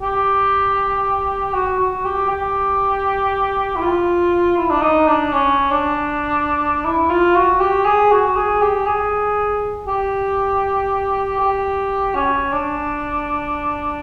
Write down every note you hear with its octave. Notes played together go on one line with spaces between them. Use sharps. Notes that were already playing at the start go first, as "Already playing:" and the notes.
G4
F#4
F#4
G4
G4
E4
F4
E4
D4
D#4
D4
C#4
D4
E4
F4
F#4
G4
G#4
F#4
G#4
G4
G#4
G4
G4
C#4
D4